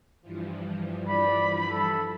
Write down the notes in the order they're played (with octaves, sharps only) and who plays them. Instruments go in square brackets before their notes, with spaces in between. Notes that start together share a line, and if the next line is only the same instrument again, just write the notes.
[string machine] G2 E3 F3
[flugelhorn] D5 [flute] B5
[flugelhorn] A4